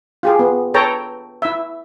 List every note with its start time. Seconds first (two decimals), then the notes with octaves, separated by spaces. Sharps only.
0.23 F4 G4 G#4
0.39 B3
0.74 A4 B4 C#5 G5 A5 A#5
1.42 E4 E5